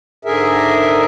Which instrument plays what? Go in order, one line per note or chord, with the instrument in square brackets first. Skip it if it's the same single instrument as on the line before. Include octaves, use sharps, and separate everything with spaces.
[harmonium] G#2 D3 G#4 A#4 E5